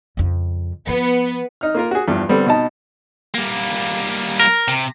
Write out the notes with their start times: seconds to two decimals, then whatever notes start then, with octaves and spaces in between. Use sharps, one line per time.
0.17 F2 C#3
0.87 F3 B3 F4
1.61 D#4 F6
1.75 A#3 F4 A#4
1.91 F#4 G#4
2.08 E2 G2 F3
2.29 D3 G3 B3 C4
2.47 B2 D#4 A5
3.35 G3 A#3
4.40 A#4
4.68 C3